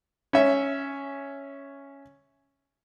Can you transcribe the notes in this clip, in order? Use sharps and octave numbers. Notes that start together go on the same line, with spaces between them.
C#4 E5